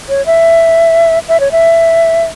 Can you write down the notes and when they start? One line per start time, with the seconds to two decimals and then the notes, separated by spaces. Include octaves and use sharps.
0.09 C#5
0.26 E5
1.28 E5
1.40 C#5
1.52 E5